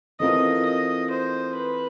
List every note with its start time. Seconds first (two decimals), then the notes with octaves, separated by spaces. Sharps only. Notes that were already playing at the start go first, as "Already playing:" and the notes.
0.20 E3 A3 C4 F4 A#4 D#5
0.65 D#5
1.10 C5
1.55 B4